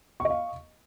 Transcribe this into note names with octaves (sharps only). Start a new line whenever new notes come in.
D#5 F5 C#6